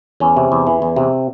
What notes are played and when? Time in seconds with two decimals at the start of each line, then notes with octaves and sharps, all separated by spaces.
0.20 E2 C#4
0.37 C3
0.52 E2
0.67 E3
0.82 E2
0.96 C3